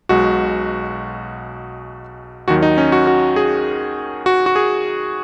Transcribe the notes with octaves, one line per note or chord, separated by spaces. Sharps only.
B1 B2 G#3 F#4
D#2 D#3 F#3 F#4
D#4
C#4
F#4
F#4
G#4
F#4
F#4
G#4